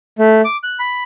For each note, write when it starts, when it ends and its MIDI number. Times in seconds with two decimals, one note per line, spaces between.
0.19 0.42 57
0.45 0.57 86
0.64 0.79 90
0.79 1.03 83